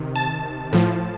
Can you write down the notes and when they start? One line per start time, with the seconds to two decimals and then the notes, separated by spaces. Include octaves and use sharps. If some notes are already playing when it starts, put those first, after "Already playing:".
Already playing: C3 D#3
0.16 A5
0.73 A2 F3